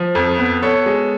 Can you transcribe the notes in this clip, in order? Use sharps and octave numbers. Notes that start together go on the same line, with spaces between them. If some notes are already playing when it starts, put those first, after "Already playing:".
Already playing: F3
F2
B3
B3 A4 C#5
G#3